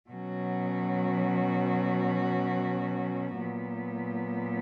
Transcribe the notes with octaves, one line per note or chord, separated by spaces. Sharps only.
B2 F#3 C#4 F#4
A#2 F#3 B3